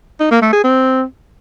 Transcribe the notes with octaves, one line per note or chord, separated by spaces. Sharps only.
D#4
A#3
A3
G#4
C4